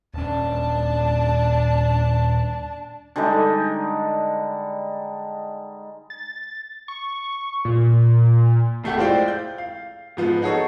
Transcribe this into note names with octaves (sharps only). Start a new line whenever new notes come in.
D#1 C#4 D4 A5
D3 G3 G#3 D#4
A6
C#6
A#2
F1 A3 G4 F#5
G#3 E4 F4 C5 D5 G5
G6
F5
G#2 F3 B3
D#4 F#4 G#4 A4 C#5